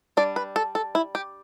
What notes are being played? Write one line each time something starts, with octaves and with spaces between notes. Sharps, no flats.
G3 D4 D5
B4
A4
A4
E4
G4